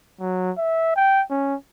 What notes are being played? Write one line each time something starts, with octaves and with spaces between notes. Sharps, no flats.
F#3
E5
G5
C#4